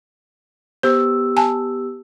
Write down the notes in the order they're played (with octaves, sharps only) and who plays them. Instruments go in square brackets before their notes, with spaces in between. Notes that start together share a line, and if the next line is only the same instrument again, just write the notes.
[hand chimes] B3 G4 E6 [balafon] C5
[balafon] G#5 A5